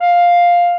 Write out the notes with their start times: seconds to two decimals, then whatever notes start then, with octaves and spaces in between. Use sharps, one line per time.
0.01 F5